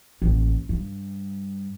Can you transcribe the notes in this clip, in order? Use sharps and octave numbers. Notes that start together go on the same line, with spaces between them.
A1 D#2
G2